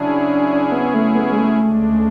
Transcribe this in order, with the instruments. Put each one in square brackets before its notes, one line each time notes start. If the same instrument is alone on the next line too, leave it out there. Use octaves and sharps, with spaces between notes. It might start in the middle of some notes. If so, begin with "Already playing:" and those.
Already playing: [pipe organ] C#3 F#3 C#4 E4 G#4 [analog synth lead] D4
[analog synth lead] B3
A3
B3
G#3
A3
[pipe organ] D2 C#3 G#3 D4